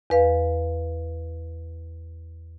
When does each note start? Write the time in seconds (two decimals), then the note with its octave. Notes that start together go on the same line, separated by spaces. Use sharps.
0.10 E2 B4 F5